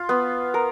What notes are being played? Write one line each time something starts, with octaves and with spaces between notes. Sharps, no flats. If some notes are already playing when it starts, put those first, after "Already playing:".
Already playing: F4
B3
A#4